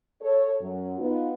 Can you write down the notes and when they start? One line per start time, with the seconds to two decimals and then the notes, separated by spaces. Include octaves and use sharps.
0.21 A4 C#5
0.61 F#2 F#3
0.98 B3 D#4 F4